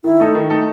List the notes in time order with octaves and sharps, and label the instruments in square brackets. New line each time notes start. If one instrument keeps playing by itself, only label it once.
[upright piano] D#3 [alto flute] E4
[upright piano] A3 D#4 A4
D#3
A3 D#4 A4